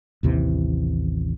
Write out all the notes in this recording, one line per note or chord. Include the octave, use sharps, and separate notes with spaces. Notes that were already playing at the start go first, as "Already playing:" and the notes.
A1 D#2 C3 E3